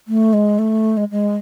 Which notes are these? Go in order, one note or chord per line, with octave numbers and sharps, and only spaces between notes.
A3
G#3
A3
G#3
G#3